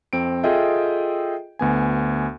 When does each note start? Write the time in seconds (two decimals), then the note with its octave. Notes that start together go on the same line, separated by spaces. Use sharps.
0.13 F2 C4 D7
0.44 F4 G#4 A4 D#5 E5 G5
1.59 D2 B3 G#5